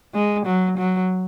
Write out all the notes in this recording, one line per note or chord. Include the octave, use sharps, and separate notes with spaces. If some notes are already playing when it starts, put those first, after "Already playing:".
G#3
F#3
F#3